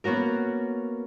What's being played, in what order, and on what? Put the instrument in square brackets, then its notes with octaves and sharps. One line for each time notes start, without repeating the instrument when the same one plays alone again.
[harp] A#3 B3 C#4 F#4 A#4